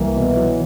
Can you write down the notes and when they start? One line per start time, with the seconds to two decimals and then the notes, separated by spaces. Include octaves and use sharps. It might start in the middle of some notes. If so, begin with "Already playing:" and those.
Already playing: C2 E3 A#3
0.16 B2
0.37 F#3